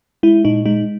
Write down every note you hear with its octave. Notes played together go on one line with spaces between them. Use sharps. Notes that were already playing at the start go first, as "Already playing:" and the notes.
G#3 E4
A#2 D#4
G#3 D#4